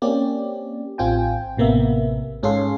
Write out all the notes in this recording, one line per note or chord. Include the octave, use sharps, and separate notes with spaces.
A#3 C4 C#4 G4 D5
A1 C4 F4 G5 G#5
A1 C3 A#3 B3 E5
G#2 C#4 G#4 A4 F5 C6